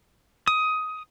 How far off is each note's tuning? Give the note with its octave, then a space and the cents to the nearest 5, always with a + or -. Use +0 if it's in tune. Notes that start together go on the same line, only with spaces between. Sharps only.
D#6 +15